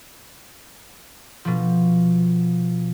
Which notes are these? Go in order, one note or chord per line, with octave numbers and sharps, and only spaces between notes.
B2 F3